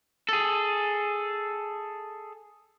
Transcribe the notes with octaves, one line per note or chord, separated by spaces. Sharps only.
G#4 A4